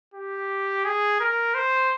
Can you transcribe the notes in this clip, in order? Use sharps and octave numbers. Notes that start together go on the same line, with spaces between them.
G4
G#4
A#4
C5